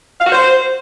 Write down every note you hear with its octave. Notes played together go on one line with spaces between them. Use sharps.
F5
F#4
C5